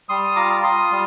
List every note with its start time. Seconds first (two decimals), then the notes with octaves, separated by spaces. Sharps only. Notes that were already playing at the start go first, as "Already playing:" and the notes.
0.09 G3 C6 D#6
0.36 F4 A#5 D6
0.63 F4 C6 D#6
0.91 G3